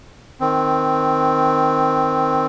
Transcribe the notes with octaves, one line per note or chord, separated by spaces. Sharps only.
D#3 C4